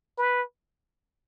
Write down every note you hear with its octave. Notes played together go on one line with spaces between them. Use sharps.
B4